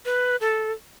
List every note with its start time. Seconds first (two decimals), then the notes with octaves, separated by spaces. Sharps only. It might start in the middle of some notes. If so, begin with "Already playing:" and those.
0.05 B4
0.41 A4